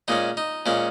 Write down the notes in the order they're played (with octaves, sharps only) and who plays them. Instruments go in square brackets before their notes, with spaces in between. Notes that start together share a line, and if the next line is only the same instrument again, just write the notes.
[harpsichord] A#2 G#3 C#4 D#4
D#4
A#2 G#3 C#4